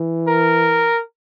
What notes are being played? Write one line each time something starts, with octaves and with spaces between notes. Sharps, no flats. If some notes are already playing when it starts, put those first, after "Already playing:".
Already playing: E3
A#4